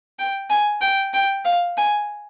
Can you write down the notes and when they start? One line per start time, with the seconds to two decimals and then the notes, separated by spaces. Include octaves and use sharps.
0.19 G5
0.50 G#5
0.82 G5
1.14 G5
1.45 F5
1.78 G#5